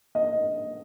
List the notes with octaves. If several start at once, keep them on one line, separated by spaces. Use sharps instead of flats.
D#5